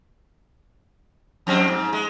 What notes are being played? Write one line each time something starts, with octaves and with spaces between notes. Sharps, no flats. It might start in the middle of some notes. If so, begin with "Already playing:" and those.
F2 C4
G#2
G#3